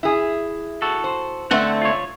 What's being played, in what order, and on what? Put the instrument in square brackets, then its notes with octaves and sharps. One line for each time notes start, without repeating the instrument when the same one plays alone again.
[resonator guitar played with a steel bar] E4 G#4
[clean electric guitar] F#4 A4
[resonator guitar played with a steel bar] C5
[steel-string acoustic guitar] D3 A3 C4 [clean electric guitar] F#5
[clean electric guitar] F4 C#5